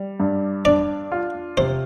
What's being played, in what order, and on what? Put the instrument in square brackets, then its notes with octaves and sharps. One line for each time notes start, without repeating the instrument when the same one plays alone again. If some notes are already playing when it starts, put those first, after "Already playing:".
Already playing: [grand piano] G3
G2
[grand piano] D4 [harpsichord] D5
[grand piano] F4
[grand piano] C3 [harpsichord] C5